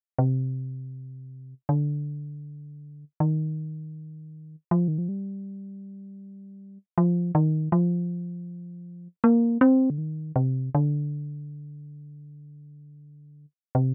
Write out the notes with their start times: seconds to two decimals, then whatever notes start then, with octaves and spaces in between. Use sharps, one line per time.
0.19 C3
1.69 D3
3.20 D#3
4.71 F3
4.88 D#3
4.98 F3
5.09 G3
6.98 F3
7.35 D#3
7.72 F3
9.24 A#3
9.61 C4
9.90 D3
9.98 D#3
10.36 C3
10.75 D3
13.75 C3